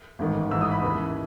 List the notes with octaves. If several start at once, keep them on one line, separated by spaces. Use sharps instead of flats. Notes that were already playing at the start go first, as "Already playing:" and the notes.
A1 G#2 D#3
A1 G#2 E3 E6
D#6
B5
D#2 C#3 E3